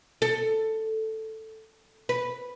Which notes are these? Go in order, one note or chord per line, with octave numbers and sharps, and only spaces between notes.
A4
B4